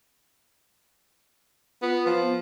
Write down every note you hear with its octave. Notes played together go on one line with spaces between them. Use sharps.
B3 F4
F3
B3